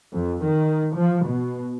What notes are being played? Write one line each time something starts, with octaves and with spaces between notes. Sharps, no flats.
F2
D#3
F3
B2